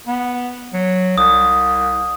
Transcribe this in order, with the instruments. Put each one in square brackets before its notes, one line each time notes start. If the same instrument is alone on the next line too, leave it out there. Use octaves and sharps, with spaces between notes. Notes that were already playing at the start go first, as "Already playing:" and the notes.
[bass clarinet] B3
F#3
[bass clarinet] C2 [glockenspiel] D#6